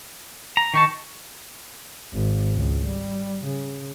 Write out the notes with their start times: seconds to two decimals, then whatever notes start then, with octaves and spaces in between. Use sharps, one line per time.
0.57 A#5
0.74 D#3 D#4 A5 C#6
2.13 G#1
2.53 C#2
2.86 G3
3.46 C#3